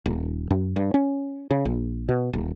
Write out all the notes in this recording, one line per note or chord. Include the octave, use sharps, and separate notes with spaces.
D#1
F#2
G2
C#4
C#3
A#1
B2
D#1